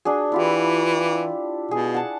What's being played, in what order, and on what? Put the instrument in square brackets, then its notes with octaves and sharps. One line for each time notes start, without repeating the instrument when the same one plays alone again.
[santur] D4 F#4 G#4
[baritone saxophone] E3 [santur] E4 F4 G4
[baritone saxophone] B2 [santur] G#4
[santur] F#5 A5